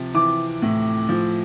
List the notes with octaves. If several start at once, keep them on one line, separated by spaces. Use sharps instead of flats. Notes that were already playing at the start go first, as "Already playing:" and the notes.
Already playing: C3 F3
E3 D6
A2
F3